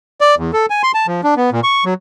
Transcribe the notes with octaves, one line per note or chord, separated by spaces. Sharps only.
D5
E2
A4
G#5
C6
A5
F3
D4
B3
A#2
C#6
F#3